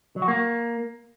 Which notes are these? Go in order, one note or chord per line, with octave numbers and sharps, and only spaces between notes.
F#3
F#4
A#3